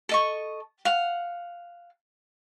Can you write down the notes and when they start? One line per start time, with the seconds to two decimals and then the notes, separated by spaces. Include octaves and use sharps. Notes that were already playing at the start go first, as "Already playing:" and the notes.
0.09 A4 D#5 C#6
0.85 F5 F#5